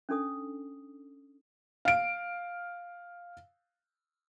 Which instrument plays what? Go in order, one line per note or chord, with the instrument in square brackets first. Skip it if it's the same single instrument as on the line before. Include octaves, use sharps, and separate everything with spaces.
[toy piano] C#4 D4 A4 D#6
[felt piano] F5 D7